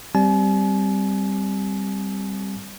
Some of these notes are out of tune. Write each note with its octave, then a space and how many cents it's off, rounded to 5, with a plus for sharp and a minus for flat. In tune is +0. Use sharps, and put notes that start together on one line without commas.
G3 +0 C4 +0 G#5 +45